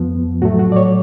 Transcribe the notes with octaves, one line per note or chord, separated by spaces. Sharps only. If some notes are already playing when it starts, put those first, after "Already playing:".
Already playing: F2 F3 B3
A2 F#3 A3 F#4
F#4
D5
C#5